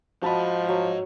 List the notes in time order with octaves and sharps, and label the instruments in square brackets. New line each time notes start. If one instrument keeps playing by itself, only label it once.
[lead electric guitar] G#2 D#5 [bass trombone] F3 [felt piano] F#4 A5 B5
[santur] F#3